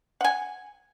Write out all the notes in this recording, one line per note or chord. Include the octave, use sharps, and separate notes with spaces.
F#5 G#5